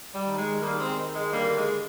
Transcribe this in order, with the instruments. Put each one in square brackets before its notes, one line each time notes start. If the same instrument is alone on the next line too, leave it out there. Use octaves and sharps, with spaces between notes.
[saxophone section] G3
D#3
G#3
D#3 G3 A#3
G#3 C4
D#3
G#3
D3 G3 A#3
G#3